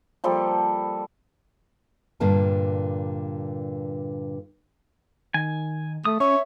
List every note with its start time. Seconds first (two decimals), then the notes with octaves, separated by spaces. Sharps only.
0.24 F3 G3 A#3 A4
2.20 G2 A#2 D3 A#3 A5
5.34 D#3 G#5
6.05 A3 D#6
6.20 C#4 C#5 E5